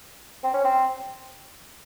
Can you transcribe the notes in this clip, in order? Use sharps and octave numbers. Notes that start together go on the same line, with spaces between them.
C4
C#4
C4